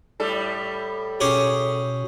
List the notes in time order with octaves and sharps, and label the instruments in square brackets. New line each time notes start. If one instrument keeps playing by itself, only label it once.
[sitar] A2 G3 A4
[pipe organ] B2 [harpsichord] C#4 G4 G#4